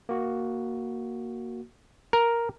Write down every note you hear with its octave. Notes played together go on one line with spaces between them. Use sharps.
A#3 F#4
A#4